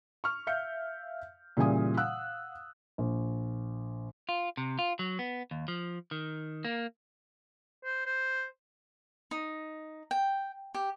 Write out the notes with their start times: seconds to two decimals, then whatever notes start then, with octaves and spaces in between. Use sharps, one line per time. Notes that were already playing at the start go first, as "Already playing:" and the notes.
0.24 C#6 F6
0.47 E5 F5 G6 C#7
1.57 A#2 C#3 E3 G3 G#5 D#6
1.97 F5 F#5 E6 F#6
2.98 A#1
4.29 F4
4.57 C3
4.79 F4
4.99 F#3
5.19 B3
5.51 D#2
5.68 F3
6.11 D#3
6.65 A#3
7.84 C5
8.06 C5
9.31 D#4
10.11 G5
10.74 G4